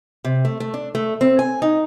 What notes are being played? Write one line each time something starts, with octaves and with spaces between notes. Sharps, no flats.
C3
A3
A3
D4
A3
C4
G#5
D#4